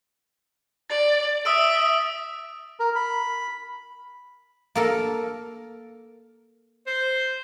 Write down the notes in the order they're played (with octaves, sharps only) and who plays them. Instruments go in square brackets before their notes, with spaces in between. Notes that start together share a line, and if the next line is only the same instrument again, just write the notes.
[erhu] D5 [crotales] A6
[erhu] E5 [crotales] D#6 E6 D7
[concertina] A#4
B5
[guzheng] A#3 A4 A#4
[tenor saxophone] C5